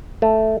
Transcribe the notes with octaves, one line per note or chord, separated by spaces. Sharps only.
A3